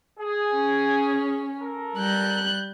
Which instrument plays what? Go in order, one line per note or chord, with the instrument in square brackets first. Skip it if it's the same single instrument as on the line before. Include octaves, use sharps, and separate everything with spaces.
[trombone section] G#4
[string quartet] C#4
[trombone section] A4 A#4
[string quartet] G3 F#6 G6